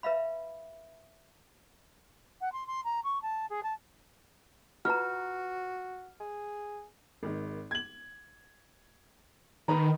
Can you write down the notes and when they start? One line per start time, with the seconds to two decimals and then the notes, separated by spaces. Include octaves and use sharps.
0.03 B4 E5 F5 B5
2.41 F#5
2.52 C6
2.67 C6
2.84 A#5
3.03 C#6
3.22 A5
3.49 G#4
3.63 A5
4.85 F4 F#4 B4 A#5 F6
6.20 G#4
7.23 G#1 D#3
7.71 G#6 F#7
9.68 D#3 B4 A#5